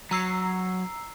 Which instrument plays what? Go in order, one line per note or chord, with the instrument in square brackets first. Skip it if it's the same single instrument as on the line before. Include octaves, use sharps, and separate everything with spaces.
[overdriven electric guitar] F#3 [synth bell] A#5 E6 C7